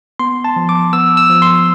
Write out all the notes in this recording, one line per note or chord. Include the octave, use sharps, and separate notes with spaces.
B3 C6
A5
F3
D6
B3 E6
E6
F3
C6